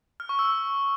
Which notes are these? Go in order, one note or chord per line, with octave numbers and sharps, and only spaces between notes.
F6
C#6
E6